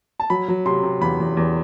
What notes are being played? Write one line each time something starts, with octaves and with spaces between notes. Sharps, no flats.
A5
F#3 B5
F#3
C3 C6
C3
E2 B5
E2
E2